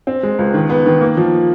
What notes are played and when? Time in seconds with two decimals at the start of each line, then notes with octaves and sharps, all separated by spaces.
0.07 C4
0.23 G#3
0.39 C#2
0.54 D#3
0.70 B3
0.86 D#3
1.01 A#3
1.17 F3